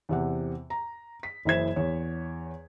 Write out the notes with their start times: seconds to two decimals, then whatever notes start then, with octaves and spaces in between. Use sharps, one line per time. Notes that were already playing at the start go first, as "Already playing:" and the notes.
0.09 E2 C3 F#5
0.70 A#5
1.23 B6
1.45 F#1 E3 E4 C5 G#6 E7
1.76 E2 C#5